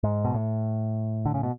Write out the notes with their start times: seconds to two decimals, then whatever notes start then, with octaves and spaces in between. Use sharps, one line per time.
0.03 G#2
0.25 B2
0.34 A2
1.25 D3
1.34 C#3
1.43 B2